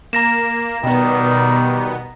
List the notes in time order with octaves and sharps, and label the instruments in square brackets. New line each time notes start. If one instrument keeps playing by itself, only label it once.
[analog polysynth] A#3 [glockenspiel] A#5 A#6 E7
[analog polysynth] B2 B3 [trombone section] D#3 G3